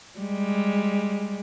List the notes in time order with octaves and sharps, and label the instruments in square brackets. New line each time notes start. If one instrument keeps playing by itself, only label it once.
[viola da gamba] G3 G#3